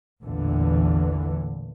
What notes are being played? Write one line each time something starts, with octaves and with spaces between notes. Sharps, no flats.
A1 E2 A#2 D3 E3